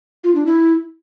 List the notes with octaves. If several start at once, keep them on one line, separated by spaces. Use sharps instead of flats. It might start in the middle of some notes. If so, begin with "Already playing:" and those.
F4
D4
E4